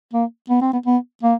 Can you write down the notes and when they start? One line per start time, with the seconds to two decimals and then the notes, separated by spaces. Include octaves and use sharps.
0.13 A#3
0.50 B3
0.61 C4
0.73 B3
0.86 B3
1.23 A#3